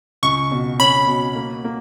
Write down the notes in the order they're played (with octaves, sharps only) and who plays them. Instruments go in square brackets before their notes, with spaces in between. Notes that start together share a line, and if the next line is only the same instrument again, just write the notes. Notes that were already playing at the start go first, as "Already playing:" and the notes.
[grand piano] C#2 [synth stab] C#6
[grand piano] B2
[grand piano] C#4 [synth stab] B5
[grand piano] B2
A#3
A#3